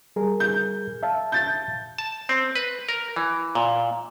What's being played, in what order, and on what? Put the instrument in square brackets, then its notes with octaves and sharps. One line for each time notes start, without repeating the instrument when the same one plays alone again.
[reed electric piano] G3 G#4 A#4
[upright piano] G6
[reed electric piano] E5 F5 A5
[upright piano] G6 A6
[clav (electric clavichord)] A5
C4
B4
A#4
E3
A#2